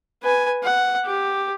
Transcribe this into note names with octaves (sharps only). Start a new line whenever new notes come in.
B4 G#5
F#5
G4